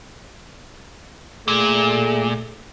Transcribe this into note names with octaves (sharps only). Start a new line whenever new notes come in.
A#2 A3 G#4